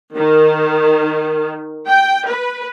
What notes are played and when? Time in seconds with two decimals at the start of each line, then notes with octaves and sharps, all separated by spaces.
0.15 D#3
1.88 G5
2.28 B4